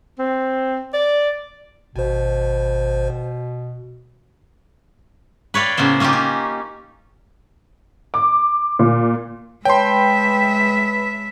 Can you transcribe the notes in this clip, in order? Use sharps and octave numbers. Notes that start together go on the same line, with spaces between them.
C4
D5
G#1 B2 C5
B4 C#5 D5 F5 G5
A2 C#3 A#3 B3 C5
A#3 C#4 D#4 F4 G4
C#4
D6
A#2
G#3 B4 C#5 E5 G5 A5 B5 C6